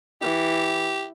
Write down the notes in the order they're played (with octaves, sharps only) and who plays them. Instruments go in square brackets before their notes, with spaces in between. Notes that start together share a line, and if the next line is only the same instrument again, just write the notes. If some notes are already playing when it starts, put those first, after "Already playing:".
[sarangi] E3 [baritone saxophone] G4